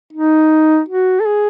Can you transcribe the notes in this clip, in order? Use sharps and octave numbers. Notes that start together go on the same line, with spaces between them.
D#4
F#4
A4
G#4